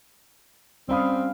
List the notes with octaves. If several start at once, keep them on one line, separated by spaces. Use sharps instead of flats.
G3 C4 C#4 D5 F5 B5 D#6